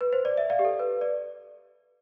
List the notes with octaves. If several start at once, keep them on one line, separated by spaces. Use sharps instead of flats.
B4
C5
D5
E5
D5 F5
G4
A4
B4
D5